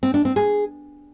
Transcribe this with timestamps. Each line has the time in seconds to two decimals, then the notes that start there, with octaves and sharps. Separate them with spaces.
0.03 C4
0.14 D4
0.25 C4
0.36 G#4